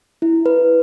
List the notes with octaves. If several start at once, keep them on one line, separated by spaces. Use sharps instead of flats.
E4
B4